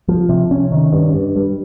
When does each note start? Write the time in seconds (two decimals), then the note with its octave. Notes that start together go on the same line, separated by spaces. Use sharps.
0.08 F3
0.29 C3
0.51 C#4
0.72 D#3
0.93 G2
1.14 G2
1.36 G3